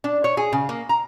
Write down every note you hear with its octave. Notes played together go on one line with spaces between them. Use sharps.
D4
C#5
G#4
C#3
A#3
A#5